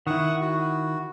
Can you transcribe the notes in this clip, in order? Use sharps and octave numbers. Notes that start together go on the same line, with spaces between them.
D#3 E4 F#5 C#6 D#6
F#4